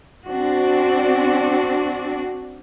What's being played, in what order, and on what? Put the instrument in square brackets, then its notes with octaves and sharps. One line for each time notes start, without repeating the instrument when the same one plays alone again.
[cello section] C4 D4 F#4